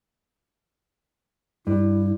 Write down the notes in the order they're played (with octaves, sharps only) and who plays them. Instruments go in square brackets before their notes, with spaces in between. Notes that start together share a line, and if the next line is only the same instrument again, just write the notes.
[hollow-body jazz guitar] G2 [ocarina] E4